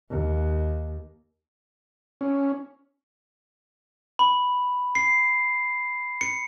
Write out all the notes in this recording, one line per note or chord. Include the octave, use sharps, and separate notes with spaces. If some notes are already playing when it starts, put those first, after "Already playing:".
D#2
C#4
B5
C7
C#7